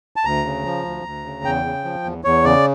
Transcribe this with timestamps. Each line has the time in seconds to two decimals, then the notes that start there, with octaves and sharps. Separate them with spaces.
0.16 A5
0.25 D2 A#5
0.45 C#3
0.65 F3
0.85 D2
1.05 D2
1.25 C#3
1.44 E2 G5
1.65 C#3
1.84 F3
2.04 E2
2.24 E2 C#5
2.44 C#3 D5